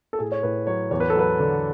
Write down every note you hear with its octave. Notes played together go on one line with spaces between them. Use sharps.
A4
A2 G#4
C#5
A2 B4
F#3 C#5
E2 C#5
B4
A4
F#3 B4
D3